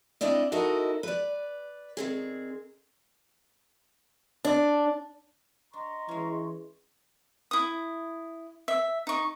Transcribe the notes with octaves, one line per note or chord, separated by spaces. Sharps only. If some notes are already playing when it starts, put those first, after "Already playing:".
C4 D4 E4 D5 D#5
D#4 E4 F#4 A4 A#4 D#5
B4 D5
D#3 C4 G#4
D4
D4 D#5 A#5 C6 C#6
E3 G#3 C#4
E4 D#6
E5
D#4 C#6